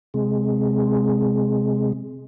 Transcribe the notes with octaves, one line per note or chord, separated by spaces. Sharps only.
C3 G#3